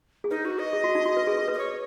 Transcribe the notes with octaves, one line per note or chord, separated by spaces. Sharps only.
G#4
D#4 B4
F#4
D#5
G#4
F#4
D#4
F#4
B4
G#4
B4
G#4
B4
D#5
C#5